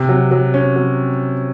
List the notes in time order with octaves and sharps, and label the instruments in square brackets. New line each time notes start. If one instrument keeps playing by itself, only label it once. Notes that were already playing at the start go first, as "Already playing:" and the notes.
Already playing: [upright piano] C3
F#3
F#3
C#4
F#3